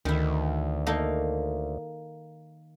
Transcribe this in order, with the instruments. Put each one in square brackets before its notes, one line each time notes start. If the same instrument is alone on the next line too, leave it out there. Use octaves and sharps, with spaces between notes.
[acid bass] D2 [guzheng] D#3 E4
[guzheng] A#3 D#4 A4